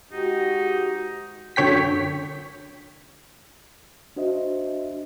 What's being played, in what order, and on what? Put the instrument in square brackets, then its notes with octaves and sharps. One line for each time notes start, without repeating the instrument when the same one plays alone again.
[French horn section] G#2 F#4 G4 [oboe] D#4
[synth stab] F#2 D3 C#5 G5 B6
[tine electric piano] D4 F#4 C5 D#5 E5